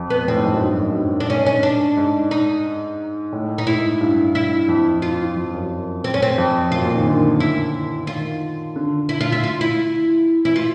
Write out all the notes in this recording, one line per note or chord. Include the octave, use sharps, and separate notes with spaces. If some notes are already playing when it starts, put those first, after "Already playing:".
Already playing: F2
B3
A2 C4
G#2
F2
F#2
G2
G#2
F#2
G2
D4
G#2 C#4
C#4
D4
G#2
D#4
A2
D#4
G#2 E4
G2
E4
F2
F4
F2
F#2
C4
C#4
C4
F2
F#2 F4
A#2
D#3
D3
E4
D#3 F4
D3
E4
F4
E4
F4
E4
E3 E4
F4